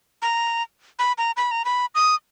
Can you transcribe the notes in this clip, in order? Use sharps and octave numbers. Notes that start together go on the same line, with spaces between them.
A#5
B5
A#5
B5
A#5
B5
D#6